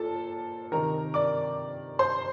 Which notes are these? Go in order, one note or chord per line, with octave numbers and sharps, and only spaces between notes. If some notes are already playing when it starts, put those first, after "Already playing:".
Already playing: A#2 A4 A5
C3 D#3 A#4 A#5
D5 D6
C5 C6